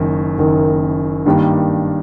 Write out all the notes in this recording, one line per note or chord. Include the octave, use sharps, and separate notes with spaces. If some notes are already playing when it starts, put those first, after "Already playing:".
Already playing: F#1 F#2 D#3
F#1 F#2 D#3
G2 D#3 G3 A#3 D4